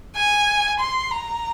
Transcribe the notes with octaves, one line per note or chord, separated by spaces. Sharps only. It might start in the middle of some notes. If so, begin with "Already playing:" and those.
G#5
C6
A#5